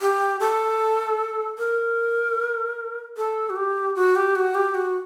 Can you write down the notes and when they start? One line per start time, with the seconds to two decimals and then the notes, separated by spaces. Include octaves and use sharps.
0.01 G4
0.40 A4
1.58 A#4
3.17 A4
3.50 F#4
3.56 G4
3.95 F#4
4.16 G4
4.35 F#4
4.55 G4
4.75 F#4